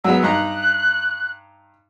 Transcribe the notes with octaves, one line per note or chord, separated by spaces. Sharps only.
F#3 G#3 B3 E6
G2 D#4 A#5 F#6